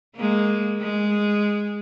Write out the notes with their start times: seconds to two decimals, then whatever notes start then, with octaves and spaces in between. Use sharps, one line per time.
0.16 G#3 A#3
0.81 G#3